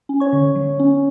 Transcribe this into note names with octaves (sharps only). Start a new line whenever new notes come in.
C#4
C#5 C#6
D3
F#3
C#4